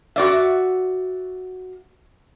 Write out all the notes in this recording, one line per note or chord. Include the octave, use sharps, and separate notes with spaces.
F#4 D5 E5